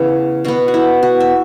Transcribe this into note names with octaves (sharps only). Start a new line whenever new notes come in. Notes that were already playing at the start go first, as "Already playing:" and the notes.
Already playing: C#3 E3 B3 B4
B2 B3 F#4
F#4
E4
F#4
E5